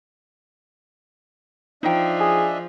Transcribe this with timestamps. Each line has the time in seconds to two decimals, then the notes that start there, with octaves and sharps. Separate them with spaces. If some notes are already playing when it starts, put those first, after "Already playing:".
1.83 F3 D4 D#4 D#5 E5 G5
2.20 G#4